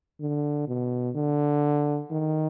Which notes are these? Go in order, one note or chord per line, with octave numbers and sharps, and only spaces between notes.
D3
B2
D3
D#3